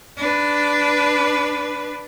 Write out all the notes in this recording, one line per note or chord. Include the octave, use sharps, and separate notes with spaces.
D4 B4